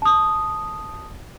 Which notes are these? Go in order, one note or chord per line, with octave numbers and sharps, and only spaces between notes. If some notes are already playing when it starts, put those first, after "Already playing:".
A5 D#6